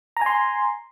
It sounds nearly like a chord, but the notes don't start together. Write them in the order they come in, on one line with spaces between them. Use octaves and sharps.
A#5 G#5 C6